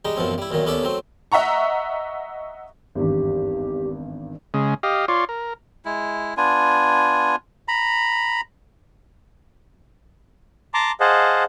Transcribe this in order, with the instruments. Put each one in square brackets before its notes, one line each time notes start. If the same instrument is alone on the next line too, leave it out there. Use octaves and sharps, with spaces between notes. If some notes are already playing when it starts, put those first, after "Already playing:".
[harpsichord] G3 G#3 D#4
A1 F#2 B2 F3 C4
G3 E4
B1 A#2 D#3 F#3
D#2 B3 C#4 A4 D5 E5
F#3 A3 C4
[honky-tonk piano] D#5 E5 F#5 A#5 C#6
[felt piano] G#1 E2 G2 [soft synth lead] G4
[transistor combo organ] C#3 G#3
G4 D#5 F5
F4 C#5 D5 C6
A#4
[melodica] G#3 E4
B3 D4 F4 G#5
A#5 B5
[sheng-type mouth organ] A5 A#5 C6 D6
G#4 C5 D#5 F5 F#5 A5